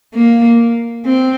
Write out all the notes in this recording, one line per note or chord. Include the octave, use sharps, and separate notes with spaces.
A#3
C4